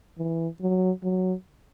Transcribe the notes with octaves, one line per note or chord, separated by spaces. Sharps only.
E3
F#3
F#3